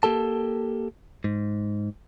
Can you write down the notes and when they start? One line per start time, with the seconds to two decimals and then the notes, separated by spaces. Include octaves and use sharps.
0.03 A#3 G4 A4 A5
1.24 G#2